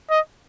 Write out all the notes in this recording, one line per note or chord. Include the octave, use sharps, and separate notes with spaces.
D#5